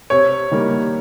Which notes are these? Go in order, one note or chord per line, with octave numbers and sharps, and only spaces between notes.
C3 C#5
D#3 G3 A#3